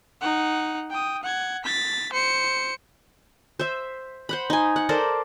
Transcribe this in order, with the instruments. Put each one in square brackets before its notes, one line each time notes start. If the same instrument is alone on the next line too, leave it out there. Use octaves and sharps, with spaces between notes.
[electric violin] D#4 F#5
G5 D#6
F#5 G#6
A6 B6
C5 C#7
[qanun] C5 E5
C5 F#5 B5
D#4 G#5
F#5
A4 A#4 C5 D5